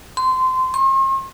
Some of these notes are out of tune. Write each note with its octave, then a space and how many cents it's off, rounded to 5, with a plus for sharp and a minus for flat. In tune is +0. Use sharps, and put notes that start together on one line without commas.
C6 -20
C6 +45